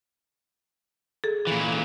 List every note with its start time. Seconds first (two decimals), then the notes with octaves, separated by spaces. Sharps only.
1.24 G#4 A4
1.47 A#2 E3